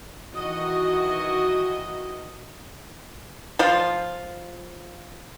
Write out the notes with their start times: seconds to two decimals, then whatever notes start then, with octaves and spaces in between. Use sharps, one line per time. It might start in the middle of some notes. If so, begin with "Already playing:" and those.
0.33 D#3 E3 F#4 D#5
3.59 F3 F4